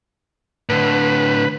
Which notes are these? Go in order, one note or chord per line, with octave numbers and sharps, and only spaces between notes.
A2 D3 B4